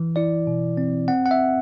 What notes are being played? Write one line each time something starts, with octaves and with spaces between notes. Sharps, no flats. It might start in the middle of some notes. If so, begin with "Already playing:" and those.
Already playing: E3
E4 D5
B2
C4
C4 F#5
F#5
E5